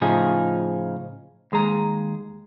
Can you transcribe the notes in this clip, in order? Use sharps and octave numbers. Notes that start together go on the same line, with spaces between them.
A2 C#3 F3 D#4 F4 G#4
D#2 G#3 G#4 A#5